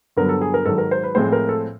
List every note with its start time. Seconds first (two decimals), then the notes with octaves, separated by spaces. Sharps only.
0.17 G2 D3 F#3 B3 A#4
0.29 A4
0.41 G#4
0.54 A#4
0.66 G#2 D#3 F#3 A4
0.78 A#4
0.91 C5
1.04 B4
1.15 A2 F3 G#3 C4 C5
1.32 A#4
1.49 A4